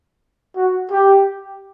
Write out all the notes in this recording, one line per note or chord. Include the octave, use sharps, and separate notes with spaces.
F#4
G4